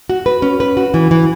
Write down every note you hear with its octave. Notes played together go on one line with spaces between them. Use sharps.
F#4
B4
C#4
B4
F#4
E3
E3